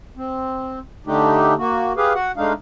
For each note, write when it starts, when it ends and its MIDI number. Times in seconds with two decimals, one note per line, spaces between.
0.17 0.79 60
1.06 1.54 50
1.06 1.54 57
1.06 1.54 62
1.06 1.54 63
1.06 1.54 67
1.58 1.93 58
1.58 1.93 66
1.97 2.13 67
1.97 2.13 68
1.97 2.13 71
1.97 2.13 77
2.15 2.32 66
2.15 2.32 78
2.37 2.53 56
2.37 2.53 57
2.37 2.53 62
2.37 2.53 63
2.37 2.53 77